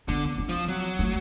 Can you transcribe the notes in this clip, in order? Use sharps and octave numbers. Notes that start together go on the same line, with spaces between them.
D3 B3
C4
F3
F#3
A3